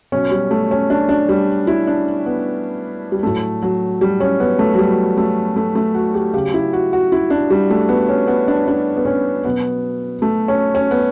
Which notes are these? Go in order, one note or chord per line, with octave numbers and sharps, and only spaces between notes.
B2 F#3 C#4
G3
A3
C#4
D4
D4
G3
E4
D4
B3
G3
A2 F#3 A3
F#3
G3
C#4
B3
A3
F#3
G3
A3
A3
A3
F#4
G4
C#3 F#3 G4
E4
F#4
F#4
E4
D4
G3
A3
B3
C#4
B3
D4
D4
B3
C#4
B2 F#3 B3
A3
C#4
C#4
B3